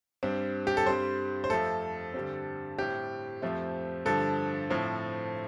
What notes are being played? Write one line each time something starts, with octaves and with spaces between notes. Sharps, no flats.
G2 G3 C4
G4
A4
G2 G3 C4 C5
C5
F2 F3 A3 C4 A4
G2 D3 G3 C4
A2 G3 C4 G4
F2 F3 A3 C4
G2 D3 F3 A4
A2 F3 C4